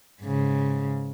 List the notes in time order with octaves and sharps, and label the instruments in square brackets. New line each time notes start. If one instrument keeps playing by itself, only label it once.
[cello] G#2 C#3